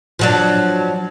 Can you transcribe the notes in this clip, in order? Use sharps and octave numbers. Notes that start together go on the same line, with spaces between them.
F3 F#3 D4